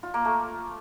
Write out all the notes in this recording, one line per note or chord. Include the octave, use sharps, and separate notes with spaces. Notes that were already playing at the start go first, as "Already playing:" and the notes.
F4
A#3
A3